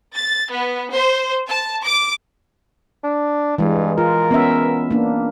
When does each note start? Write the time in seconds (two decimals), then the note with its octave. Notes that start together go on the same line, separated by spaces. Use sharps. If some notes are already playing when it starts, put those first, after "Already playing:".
0.15 A6
0.50 B3
0.92 C5
1.46 A5
1.82 D6
3.04 D4
3.58 G2 E3 G#3
3.98 F4 A#4
4.31 B3 C#4 E5
4.91 A#3 D4